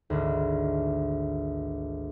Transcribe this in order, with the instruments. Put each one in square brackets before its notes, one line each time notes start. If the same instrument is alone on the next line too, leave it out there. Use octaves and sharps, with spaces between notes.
[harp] G#1 D2